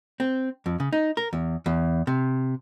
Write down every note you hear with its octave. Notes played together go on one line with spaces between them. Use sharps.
C4
F2
C#3
D#4
A#4
E2
E2
C3